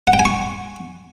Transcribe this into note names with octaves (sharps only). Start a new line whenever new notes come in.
F#5
G5
G#5
C#6